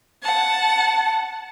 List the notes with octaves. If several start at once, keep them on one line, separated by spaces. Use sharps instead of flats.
F#5 A5